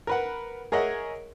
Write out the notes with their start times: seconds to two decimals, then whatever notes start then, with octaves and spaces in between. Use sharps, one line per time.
0.07 A#4 B4 F#5
0.72 G#4 A#4 C#5 D#5 E5 F#5